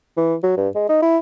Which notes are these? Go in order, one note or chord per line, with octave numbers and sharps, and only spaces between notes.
E3
F#3
G2
G#3
D#4
E4